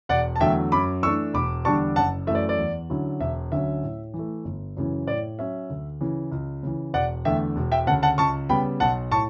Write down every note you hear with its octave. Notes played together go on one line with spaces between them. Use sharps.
E1 D5 F#5
A5
E2 D3 F#3 A3 E5 G5
F#2 B5 D6
E3 A3 D4 C#6 E6
E1 B5 D6
E2 D3 G3 D4 A5 C#6
F#1 F#5 A5
F#2 E3 A3 E5
D5
D5
E2
D3 F#3 C#4 E4
E1 E5
D2 D3 F#3 C#4 E5
A2
E3
A3
G1
F#2 C#3 E3
A2 D5
F#3 C#4 E5
D2
C#3 E3
C#2
C#3 E3
E1 D5 F#5
E2 D3 A3 E5 G5
E1
E5 G5
D2 C#3 F#5 A5
F#5 A5
C#2 A5 C#6
C#3 G3 B3 G5 B5
B1 F#5 A5
A2 A5 C#6